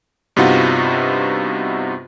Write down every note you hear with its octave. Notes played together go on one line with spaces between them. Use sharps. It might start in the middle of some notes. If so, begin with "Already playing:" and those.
G2 C3 B3 D#4 F4 F#4